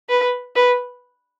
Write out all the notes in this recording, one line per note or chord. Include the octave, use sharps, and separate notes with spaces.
B4
B4